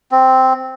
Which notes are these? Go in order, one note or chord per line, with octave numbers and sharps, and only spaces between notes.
C4